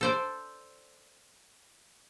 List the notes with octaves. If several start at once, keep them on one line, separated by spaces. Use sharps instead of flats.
A4 C5 D5